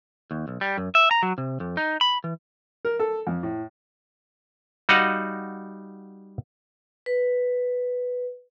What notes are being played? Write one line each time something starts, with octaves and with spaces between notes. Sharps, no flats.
D#2
B1
G3
F#2
E5
A#5
F#3
C3
F2
D#4
B5
E3
A#4
A4
F2
A2
G3 D#4 F#4 D#5 F5 F#5
B4